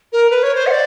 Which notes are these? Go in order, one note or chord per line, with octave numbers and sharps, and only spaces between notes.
A#4
B4
C#5
C5
F#5
D5